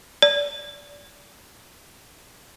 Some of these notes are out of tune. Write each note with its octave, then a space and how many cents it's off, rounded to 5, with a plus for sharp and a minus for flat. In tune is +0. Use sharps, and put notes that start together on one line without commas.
D5 -25